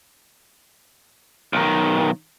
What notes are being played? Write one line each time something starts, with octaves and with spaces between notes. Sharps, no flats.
B1 D#3